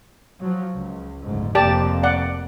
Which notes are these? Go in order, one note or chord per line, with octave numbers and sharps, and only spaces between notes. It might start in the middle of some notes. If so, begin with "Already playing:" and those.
F3 F#3
C#2
F#1 D2 G#2
F1 F2 A#3 G4 D5 A5
D5 F#5